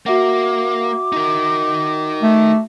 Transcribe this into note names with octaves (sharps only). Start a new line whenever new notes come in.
A#3 F#4 E5 F#5 D6
D#4 A#4
A3